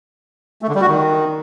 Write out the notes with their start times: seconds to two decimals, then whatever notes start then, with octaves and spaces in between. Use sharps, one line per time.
0.62 A3
0.69 D3
0.75 G3
0.81 F#4
0.88 D#3